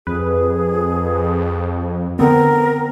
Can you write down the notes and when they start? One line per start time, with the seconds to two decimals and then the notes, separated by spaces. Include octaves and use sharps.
0.07 F2 G#4 B4
2.19 D3 B3 C4 A#4